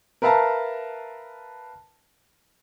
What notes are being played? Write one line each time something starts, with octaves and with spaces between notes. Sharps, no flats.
A#4 B4 E5 F5 A5 A#5